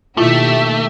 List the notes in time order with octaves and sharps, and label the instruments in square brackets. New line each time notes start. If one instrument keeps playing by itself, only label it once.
[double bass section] B2 D#3 A#3 [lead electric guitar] A3 [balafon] E4 F4 [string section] G4 E5